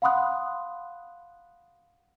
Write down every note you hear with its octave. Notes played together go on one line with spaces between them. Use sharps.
F5 F#5 B5 C6 D#6 F#6